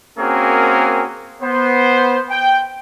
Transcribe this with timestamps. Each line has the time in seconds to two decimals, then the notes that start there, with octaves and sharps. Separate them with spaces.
0.19 A#3 C4 C#4 F#4 G#4 A#4
1.42 B3 C5
2.30 G5